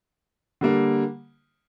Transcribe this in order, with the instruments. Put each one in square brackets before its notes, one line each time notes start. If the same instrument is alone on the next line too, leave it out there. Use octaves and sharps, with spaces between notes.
[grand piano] D3 G3 A#3